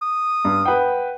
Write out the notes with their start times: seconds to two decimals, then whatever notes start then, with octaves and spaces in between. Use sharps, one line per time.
0.02 D#6
0.45 G2
0.65 B4 F#5 G5